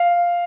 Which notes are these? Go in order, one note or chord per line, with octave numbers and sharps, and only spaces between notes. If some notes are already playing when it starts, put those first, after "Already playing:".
Already playing: F5